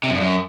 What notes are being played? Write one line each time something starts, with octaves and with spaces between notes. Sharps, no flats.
C3
F#2
G2
F#2